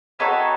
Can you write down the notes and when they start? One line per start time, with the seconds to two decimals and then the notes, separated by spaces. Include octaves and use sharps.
0.19 C4 D#4 F#4 A4 B4 C#5